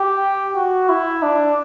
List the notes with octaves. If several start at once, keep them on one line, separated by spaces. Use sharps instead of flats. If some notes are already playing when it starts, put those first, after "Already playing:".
Already playing: G4
F#4
E4
D4